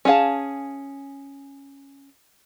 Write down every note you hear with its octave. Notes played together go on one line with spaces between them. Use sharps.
C#4 D4 G#4 F5 A5